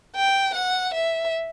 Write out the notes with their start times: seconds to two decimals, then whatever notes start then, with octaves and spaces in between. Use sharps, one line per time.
0.15 G5
0.55 F#5
0.94 E5